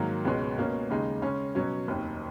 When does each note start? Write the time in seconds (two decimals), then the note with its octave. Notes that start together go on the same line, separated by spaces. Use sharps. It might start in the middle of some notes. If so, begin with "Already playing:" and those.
Already playing: G#2 D#3 F#3 A#3
0.25 C#2 B2 G#3 C#4
0.58 B2 A#3 C#4
0.89 D#2 C#3 G#3 D#4
1.22 C#3 G#3 C#4
1.55 B2 F#3 C#4
1.88 F1 D#2 D#3